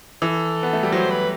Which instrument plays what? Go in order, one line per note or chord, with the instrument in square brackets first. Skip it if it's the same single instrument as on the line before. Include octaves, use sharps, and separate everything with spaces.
[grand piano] E3 [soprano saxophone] A4
[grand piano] B3
A3
G3
[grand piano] F#3 [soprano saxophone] C5
[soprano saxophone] B4